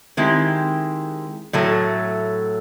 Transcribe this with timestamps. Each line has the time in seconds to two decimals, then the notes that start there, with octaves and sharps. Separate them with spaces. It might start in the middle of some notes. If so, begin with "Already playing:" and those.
0.17 D#3 G#3 C4 E4 G4
1.53 A2 F#3 A3